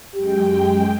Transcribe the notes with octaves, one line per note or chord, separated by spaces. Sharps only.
F#2 G#3 G4 G5